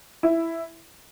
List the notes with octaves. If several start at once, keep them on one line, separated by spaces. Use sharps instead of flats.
E4